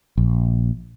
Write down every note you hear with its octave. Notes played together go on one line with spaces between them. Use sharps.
A#1